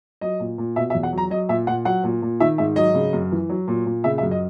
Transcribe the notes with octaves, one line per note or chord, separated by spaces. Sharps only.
F#3 D#5
A#2
A#2
B2 E5
E5
E2
F#5
F#3 A#5
F#3 D#5
A#2 E5
A#2 F#5
F#3 F#5
A#2
A#2
D#3 E5
G#2 E5
F#3 D#5
C#3
F#2
E3
F#3
A#2
A#2
C#3 E5
E5
F#2
D#5